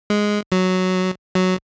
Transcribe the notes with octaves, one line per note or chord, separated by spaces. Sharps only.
G#3
F#3
F#3